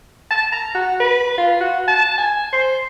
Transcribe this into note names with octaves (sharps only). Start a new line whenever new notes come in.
A5
A#5
F#4
B4
F4
F#4
A5
G#5
C5